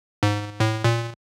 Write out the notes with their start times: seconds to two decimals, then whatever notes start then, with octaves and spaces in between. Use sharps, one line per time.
0.23 G#2
0.60 A2
0.84 A#2